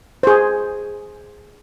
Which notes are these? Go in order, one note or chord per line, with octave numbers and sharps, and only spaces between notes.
G#4 C5